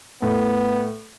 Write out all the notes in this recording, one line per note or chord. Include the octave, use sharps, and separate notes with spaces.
A2 B3